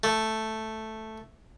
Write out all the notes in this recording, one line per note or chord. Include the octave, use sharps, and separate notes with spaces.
A3